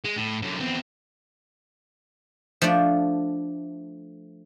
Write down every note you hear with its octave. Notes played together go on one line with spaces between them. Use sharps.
G#3
A2
F#2 D3
E2 C4
F3 A3 D4 D5